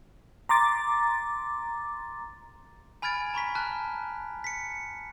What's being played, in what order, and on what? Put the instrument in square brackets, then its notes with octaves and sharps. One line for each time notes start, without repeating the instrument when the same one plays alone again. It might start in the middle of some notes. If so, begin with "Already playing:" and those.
[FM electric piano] A#5 C6 D6 A6
[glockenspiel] G#5 B5 F6 G#6 A6 D7
A#5 B5 C#6 B6
A5 F6 F#6
B6 C#7